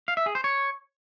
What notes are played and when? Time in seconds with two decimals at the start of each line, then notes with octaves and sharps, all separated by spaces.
0.08 F5
0.17 E5
0.26 G#4
0.35 C5
0.44 C#5